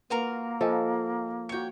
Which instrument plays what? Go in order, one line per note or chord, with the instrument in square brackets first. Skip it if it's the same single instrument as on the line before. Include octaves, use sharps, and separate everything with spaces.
[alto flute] A#3 [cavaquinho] F4 F#4 A#4 [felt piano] B4
[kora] F3 A4 [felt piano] C5 D#5 G#5
[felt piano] F#4 C#7 [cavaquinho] C#5 G5